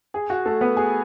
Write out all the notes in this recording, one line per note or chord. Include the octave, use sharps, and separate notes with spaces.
G#4
F#4
A3 A4
B3 B4
G#4 G#5